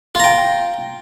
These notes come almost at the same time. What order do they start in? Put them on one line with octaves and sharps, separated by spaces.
F4 A#5 G5